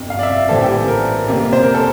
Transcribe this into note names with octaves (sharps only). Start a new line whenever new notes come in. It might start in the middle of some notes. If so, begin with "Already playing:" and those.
Already playing: G1 F2 C3
F5
D5
E5
A#1 A2 E3 G3 C4 A4
G4
A#4
F2 C3 G3 A#3
C5
A#4
A4